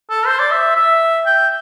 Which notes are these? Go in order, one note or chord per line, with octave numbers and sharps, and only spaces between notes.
A4
C5
D5
E5
E5
G5